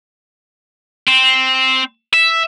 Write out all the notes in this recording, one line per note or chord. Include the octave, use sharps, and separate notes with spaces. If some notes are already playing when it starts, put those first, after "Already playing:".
C4
E5